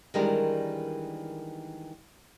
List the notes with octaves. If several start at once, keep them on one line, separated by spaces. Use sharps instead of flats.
D#3 E3 G3 G#3 D4 A#4